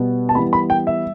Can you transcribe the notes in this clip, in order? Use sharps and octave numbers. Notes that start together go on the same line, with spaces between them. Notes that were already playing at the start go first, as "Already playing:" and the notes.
Already playing: B2 G3 B3
A5
E3 G3 B3 B5
B5
G5
E5